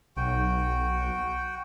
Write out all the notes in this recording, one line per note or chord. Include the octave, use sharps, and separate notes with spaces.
B1 F#4 G5